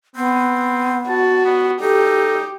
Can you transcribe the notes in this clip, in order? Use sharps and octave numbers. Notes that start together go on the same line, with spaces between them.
B3 C4
F#4 A5
B3
D#4 G4 A4